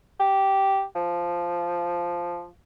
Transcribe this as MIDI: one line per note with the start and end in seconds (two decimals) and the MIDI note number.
0.20 0.84 67
0.95 2.47 53